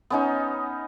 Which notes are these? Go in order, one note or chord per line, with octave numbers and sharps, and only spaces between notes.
B3 C#4 D#4